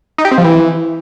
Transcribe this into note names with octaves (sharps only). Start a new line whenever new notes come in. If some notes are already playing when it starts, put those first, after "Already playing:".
D#4
G4
C4
F3
E3